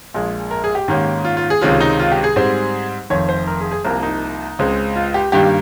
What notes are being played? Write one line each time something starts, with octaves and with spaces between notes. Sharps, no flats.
A#1 A#2 G#3
A#4
G#4
G4
G#2 D#3 A#3 C#4
F4
F4
G#4
C#2 C3 D#3 G#3 C#4 F4
D#4
F4
G4
G#4
G#2 G3 C4
F1 F2 D#3 C#5
C5
A#4
G#4
G#4
C2 C3 F3 A#3 A#4
D#4
C#2 C#3 G#3 C4
F4
G4
G2 D#3 G3 A#3 G4